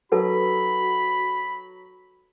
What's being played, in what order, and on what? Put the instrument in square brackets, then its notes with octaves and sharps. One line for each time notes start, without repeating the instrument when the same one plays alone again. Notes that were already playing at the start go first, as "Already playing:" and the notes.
[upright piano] F#3 [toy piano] D#4 A4 B4 [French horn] F#4 [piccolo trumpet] B5